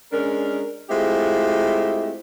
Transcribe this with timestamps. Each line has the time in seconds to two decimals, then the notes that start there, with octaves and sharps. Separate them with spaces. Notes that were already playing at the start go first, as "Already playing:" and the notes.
0.13 G#3 C#4 D4 A#4
0.90 G#3 A3 C4 E4 F4 G4